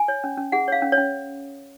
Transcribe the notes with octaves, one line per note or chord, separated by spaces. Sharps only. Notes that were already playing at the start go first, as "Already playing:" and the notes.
Already playing: G#5
C#5
C#4
C#4
G#4 F#5
C#5 F5
C#4
C#5
C#4